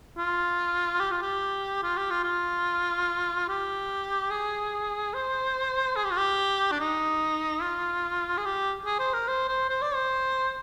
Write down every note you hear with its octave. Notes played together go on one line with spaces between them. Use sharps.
F4
G4
F4
G4
F4
G4
F4
F4
G4
G#4
C5
G#4
G4
F4
G4
D4
D#4
F4
G#4
G4
G#4
C5
A#4
C5
C5
C5
D5
C5